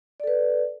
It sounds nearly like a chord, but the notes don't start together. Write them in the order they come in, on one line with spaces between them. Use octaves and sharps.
D5 A4 B4